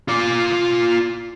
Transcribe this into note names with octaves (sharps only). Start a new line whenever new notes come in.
F4 D5